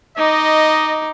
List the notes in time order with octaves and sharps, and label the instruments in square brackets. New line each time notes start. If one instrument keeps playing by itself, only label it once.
[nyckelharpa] D#4 D6 [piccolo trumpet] D#5